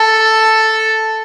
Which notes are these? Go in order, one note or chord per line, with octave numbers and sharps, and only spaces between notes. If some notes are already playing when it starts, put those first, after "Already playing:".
Already playing: A4